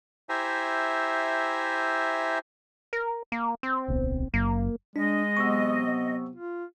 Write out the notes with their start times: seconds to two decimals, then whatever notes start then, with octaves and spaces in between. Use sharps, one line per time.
0.29 E4 G4 C5 E5 G#5 A#5
2.93 A#4
3.32 A#3
3.63 C4
3.88 D1 B1 B3
4.34 F#1 F#2 A#3
4.96 G#3 D4 D#5
5.37 C3 F#3 B3 C#6 E6
6.36 F4